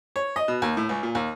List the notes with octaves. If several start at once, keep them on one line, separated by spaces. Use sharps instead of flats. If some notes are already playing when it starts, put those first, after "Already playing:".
C#5
D#5
B2
D#2
A2
C#2
A#2
D#2